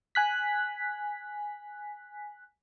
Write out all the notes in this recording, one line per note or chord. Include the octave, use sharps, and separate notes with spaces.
G#5 F#6 B6